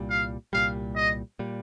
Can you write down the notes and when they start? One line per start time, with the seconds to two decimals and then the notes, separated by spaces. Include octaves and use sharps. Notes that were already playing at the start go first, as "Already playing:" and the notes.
Already playing: C2 A#2 G3
0.10 F5
0.53 C2 A#2 G3 F5
0.96 D#5
1.39 A#2 G3